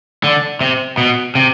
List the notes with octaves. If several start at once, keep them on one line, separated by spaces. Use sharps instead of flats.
D3
C3
B2
C3